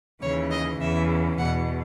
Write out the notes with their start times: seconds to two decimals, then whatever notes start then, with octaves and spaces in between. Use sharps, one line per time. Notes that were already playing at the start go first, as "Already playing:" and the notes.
0.21 D#2 C#3 E3 C#5
0.50 D#5
0.80 E2 C#3 E3 E5
1.38 E2 B2 F#5